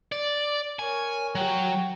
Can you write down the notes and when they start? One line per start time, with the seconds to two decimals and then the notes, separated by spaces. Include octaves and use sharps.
0.12 D5
0.79 A#4 C#5 G#5
1.35 F#3 F#4 G5